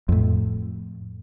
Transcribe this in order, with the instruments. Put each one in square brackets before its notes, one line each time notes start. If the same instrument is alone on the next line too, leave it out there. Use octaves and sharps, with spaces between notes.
[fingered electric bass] F2 A2